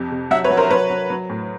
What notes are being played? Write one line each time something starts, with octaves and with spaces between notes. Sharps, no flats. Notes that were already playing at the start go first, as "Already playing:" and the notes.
Already playing: F2 C3
C3
F#3 E5 F#5
B4 C#5
F#3
A#4 C5
F#3 B4 C#5
F#3
F#3
A2